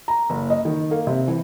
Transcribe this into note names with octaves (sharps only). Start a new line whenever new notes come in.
A#5
F#1
D#5
D#3
A#3
C3
E3